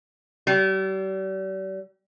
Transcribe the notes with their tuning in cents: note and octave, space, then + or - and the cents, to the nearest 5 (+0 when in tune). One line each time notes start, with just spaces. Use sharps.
G3 -40